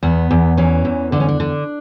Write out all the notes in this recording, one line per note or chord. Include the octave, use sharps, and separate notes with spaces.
E2 B3
E2
E3 C#4
E2
D3 D4
C#4
D4
D3